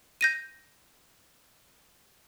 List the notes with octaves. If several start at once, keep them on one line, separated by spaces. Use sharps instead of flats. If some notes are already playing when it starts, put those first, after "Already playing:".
G6 A#6 D#7